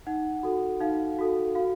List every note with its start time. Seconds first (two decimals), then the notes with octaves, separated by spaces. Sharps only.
0.07 D#4 F#5
0.43 F#4 A4
0.81 D#4 F5
1.18 F#4 A4
1.55 F#4 F5